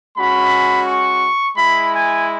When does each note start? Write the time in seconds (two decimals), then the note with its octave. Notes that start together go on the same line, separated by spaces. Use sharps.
0.16 G#3 C#4 F#4 B5
0.86 C#6
1.57 G#3 E4 B5
1.92 G#5